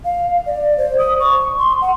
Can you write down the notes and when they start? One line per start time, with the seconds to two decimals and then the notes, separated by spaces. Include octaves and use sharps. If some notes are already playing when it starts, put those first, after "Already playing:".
0.05 F5
0.47 D5
0.78 C5
0.98 D#6
1.20 C#6
1.59 C6
1.81 F#5